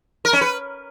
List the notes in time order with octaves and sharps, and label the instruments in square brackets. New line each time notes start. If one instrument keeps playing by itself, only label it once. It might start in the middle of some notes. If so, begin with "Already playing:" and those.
[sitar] A#4
C#4
B4